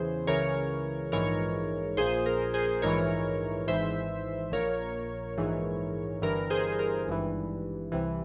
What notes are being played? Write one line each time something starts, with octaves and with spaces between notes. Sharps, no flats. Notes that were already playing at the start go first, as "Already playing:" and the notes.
Already playing: E2 C#3 E3 G#4 C5
C#2 C#3 E3 A#4 C#5
A#1 G#2 E3 A#4 C#5
A#1 A#2 G#4 C5
A#4
G#4 C5
A#1 G#2 E3 A#4 C#5
G#1 G#2 E3 C5 E5
A#1 A#2 A#4 C#5
A#1 G#2 E3
G1 G2 E3 A#4
G#4 C5
A#4
G#1 G2 E3
C2 C3 E3